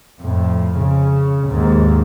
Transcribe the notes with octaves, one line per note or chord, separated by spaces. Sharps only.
F2 A2
C#3
D#2 G#2